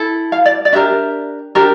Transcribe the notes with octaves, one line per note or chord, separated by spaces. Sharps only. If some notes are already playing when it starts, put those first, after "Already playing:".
Already playing: E4 A4
F5
D5
D5
D4 G4 A#4 E5
D4 G4 A#4